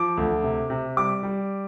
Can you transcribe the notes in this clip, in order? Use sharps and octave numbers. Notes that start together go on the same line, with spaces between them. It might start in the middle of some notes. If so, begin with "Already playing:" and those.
Already playing: F3 D6
D2
C3
C3
G3 D6
G3